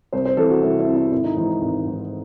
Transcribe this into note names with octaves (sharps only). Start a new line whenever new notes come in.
C2 C5
C5
C3 E3 A4
F#4
C2 E4
E4
C3 E3
E4
G#1 E4
D#4
G#2 E3 D#4
E4
G#1
G#2 E3